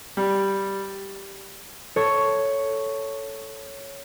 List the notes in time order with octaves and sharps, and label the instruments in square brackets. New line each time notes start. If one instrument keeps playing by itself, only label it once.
[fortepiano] G3
[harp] A4 C#5